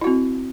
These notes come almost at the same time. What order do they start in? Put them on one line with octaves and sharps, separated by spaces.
E4 F#4 C4